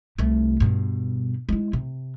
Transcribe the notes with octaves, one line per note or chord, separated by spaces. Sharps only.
C2 A3
G2 B2
G#3 E4
C3